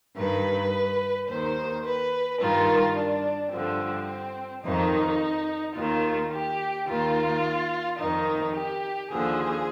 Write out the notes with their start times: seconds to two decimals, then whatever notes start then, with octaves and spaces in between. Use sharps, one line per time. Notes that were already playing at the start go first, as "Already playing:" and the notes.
0.16 G2 D#3 B4
1.28 D#2 D#3 C5
1.84 B4
2.40 G2 D#3 F4
2.95 D4
3.51 G2 D3 F3 C4
4.64 F2 D#3 D#4
5.76 D#2 D#3 F4
6.32 G4
6.88 D#2 D#3 F4
7.99 F2 D#3 D#4
8.55 G4
9.11 D#2 D3 F3 G#4